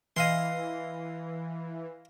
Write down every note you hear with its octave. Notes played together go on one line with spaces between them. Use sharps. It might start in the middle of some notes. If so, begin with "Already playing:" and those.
E3 D#5 F5 C6